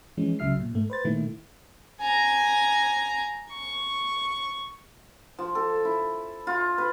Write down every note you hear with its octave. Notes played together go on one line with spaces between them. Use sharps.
E3 F3 G#3 C#4
C#2 C#3 F#3 E5 F6 C7
A#2
G#2 A3
B4 C5 A6
A#2 D#3 A3 E4
G#5 A#5
C#6
F3
A4
E4
F4
B4